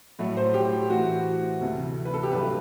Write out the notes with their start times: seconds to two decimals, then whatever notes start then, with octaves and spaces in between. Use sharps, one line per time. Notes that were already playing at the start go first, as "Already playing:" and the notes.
0.19 A2 F#3 A3
0.37 C5
0.54 G4
0.90 A2 E3 A3 F#4
1.61 D2 C3 E3 A3
2.05 B4
2.14 A4
2.23 G4
2.32 G2 F#3 A3 B4